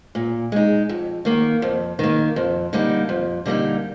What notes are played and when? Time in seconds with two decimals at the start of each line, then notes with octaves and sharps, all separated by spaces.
0.15 A#2
0.52 G#3 D#4
0.89 F2
1.25 D#3 A#3
1.62 F2
1.99 D#3 A#3
2.36 F2
2.73 D3 G3 A#3 D#4
3.09 F2
3.46 D3 G3 A#3 D#4